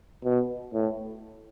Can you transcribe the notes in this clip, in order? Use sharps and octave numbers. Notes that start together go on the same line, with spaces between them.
B2
A2